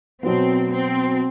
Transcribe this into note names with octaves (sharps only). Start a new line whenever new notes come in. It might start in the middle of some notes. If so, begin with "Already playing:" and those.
B2 F#3 B3 C4
C4